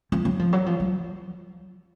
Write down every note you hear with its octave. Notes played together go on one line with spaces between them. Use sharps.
F3
F#3
F3
F#3
F3
F#3